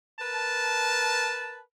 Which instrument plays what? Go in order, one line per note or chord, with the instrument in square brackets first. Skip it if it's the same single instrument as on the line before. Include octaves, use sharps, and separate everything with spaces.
[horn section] A#4 B4 A5